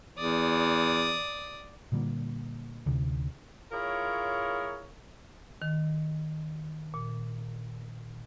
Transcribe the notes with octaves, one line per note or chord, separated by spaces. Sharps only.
E2 D5 D#6
A#2 D3 G3 A#3
D2 C3
E4 F4 G#4 A#4 C#5
D#3
A#2